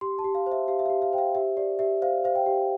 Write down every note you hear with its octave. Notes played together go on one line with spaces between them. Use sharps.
G4 C6
A5
G4
F5
C5
E5
G4 F5
E5
G4 F5
F5
C5 G5
F5
G4 E5
G4 D5
G4 E5
C5 F5
C5 F5
G5
G4